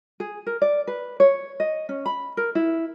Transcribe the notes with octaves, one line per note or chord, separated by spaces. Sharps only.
G#4
A#4
D5
B4
C#5
D#5
C#4
B5
A#4
E4